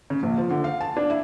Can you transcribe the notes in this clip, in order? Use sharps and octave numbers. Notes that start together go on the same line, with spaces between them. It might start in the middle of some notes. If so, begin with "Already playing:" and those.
C#3
A#1
F3
D3
F5
A5
D4
E4